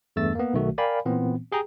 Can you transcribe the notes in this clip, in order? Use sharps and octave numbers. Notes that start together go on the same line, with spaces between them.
E2 G2 A3 E6 A6
A#3 B3
B1 D#3 A3 F#4
A#4 D5 F5 G5 G#5 B5
A#2 E3 B3 C4
G4 G#4 G5 A#5